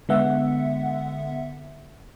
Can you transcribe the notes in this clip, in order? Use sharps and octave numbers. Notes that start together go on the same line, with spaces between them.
D3 G#3 B3 E5 F#5